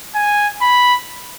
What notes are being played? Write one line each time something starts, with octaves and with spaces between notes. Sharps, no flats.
G#5
B5